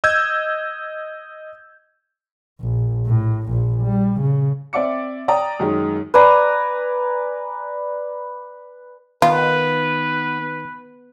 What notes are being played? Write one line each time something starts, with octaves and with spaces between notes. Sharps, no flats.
D#5 E6 G6 G#6
A#1
A2
A#1 A#2
G3
C#3
C4 D5 E5 D6 C#7
D5 G5 A#5 D#6
F#2 D#3 G#3
B4 D5 G#5 A#5
D#3 B3 F4 B4